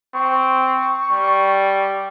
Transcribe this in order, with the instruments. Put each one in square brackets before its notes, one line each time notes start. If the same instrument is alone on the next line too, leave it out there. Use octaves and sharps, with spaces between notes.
[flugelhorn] C4 [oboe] C#6
[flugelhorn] G3